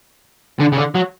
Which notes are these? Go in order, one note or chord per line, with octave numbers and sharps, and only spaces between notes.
D3
C#3
D3
F#3